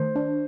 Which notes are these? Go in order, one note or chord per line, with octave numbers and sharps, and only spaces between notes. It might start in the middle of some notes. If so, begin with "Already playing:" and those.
Already playing: D#3 A3 C5
D4